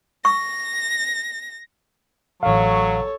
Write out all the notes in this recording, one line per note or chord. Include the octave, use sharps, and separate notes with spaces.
C#6 A#6
A1 F#3 A4 C#5 F5